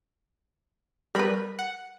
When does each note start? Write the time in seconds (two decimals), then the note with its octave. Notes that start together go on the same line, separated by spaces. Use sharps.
1.15 G3 A#4 B4 B5
1.59 F#5